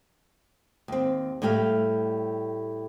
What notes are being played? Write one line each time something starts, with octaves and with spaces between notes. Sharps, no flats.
D#2 C4
A2 G3 A3 G4 F5